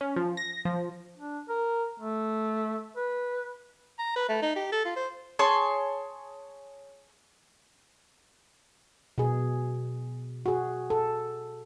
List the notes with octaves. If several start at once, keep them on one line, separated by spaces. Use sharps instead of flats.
C#4
F3
A#6
F3
D4
A#4
A3
B4
A#5
B4
A3
D#4
G4
A4
F4
C5
G#4 C#5 A5 C6
B2 G#4
F#4 G#4
A4